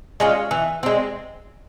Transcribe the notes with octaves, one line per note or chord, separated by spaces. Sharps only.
G#3 C#4 F4
E3
G#3 C4